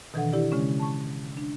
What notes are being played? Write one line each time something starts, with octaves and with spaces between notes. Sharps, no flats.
B2 D#3 E3 D4 A4 F#5
E4 G4 D5
C#3 G#3 C#4
A5 C#6
D4